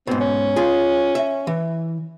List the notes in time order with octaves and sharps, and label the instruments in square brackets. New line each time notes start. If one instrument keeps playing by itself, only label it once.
[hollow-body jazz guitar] G#2 B2 [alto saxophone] C4
[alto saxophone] C#4
[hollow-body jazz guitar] F4 G#4
E5
E3